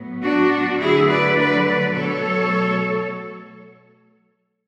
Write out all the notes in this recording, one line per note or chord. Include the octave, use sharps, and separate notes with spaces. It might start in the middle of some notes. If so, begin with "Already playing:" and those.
Already playing: A2 F#3 B3
D4 F#4
D3 F#3 A3 E4 G#4
B4 D5
B4 D5
B4 D5
B2 F#3 A3 A4 C#5